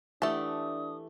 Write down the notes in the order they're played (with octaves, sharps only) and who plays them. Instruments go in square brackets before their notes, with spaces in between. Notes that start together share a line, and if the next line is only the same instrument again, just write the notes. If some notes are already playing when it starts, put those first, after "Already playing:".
[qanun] E3 G4 F#5 [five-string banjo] A3 A5 [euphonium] D4 [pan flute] D#6